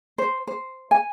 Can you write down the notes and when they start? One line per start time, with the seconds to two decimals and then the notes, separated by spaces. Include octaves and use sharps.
0.18 C5
0.47 C5
0.91 G#5